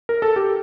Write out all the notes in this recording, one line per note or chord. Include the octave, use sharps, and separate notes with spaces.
A#4
A4
G4